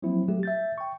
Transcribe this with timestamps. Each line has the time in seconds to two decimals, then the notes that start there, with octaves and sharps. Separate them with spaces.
0.02 F3 F#3 A#3 C4 E4
0.28 F#3 G3 A3 F#4 G4
0.43 E5 G6 A6
0.78 G5 C#6